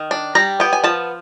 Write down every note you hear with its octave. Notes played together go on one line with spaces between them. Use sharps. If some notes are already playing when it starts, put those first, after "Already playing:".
Already playing: D#3
D4
G3 A#5
B3 G5
G#5
F3 A5